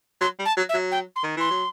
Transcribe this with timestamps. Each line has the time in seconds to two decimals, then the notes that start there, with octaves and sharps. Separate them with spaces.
0.21 F#3 C6
0.39 G3
0.45 A5
0.57 F#3
0.69 E5
0.74 F#3
0.92 G5
1.16 C6
1.24 D#3
1.37 E3 C6
1.50 F#3